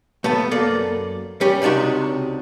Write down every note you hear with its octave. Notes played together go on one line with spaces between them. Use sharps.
A3 B3 A5
F#2 A#3 A4 D5
G3 C#4 G4
C#2 C3 D4 D#4 F#4